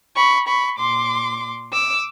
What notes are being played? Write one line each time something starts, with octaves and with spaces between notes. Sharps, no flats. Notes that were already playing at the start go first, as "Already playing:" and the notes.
B5 C#6
B5 C#6
A#2 C6 D6
D6 E6